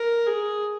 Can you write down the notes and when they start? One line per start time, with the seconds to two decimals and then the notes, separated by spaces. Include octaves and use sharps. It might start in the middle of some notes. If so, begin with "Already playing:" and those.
Already playing: A#4
0.27 G#4